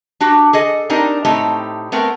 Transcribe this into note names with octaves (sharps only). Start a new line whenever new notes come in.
D4 F#4 G4
G#4 A4 D#5
C4 D4 D#4 G4 A#4
A2 A3 C4 D#4 G4
A3 B3 C4 A#4 G5